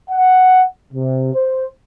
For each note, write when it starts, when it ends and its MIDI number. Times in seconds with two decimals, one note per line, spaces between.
0.11 0.64 78
0.93 1.33 48
1.34 1.65 72